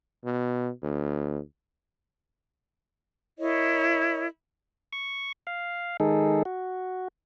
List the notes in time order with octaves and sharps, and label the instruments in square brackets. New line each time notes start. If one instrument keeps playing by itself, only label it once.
[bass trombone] B2
D2
[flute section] E4 A#4 C#5 D#5
[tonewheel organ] C#6
F5
D#3 G#3 D#4 G#4 A4
F#4